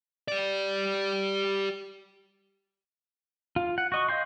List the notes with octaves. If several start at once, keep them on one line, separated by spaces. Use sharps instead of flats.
G4 D5
F4
F#5
F#4 D#5 C#6
D#5 F5 G5 C6